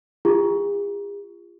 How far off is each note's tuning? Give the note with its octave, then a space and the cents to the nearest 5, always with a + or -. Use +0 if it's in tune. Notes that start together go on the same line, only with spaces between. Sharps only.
F4 -25 G#4 -45